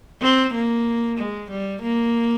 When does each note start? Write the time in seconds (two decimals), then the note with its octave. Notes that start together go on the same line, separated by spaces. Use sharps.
0.22 C4
0.54 A#3
1.18 G#3
1.51 G3
1.82 A#3